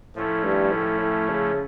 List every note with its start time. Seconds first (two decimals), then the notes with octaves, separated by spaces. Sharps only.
0.15 A2 F3 A3 C#4 E4
0.44 G2
0.72 A2
1.01 A2
1.30 C#3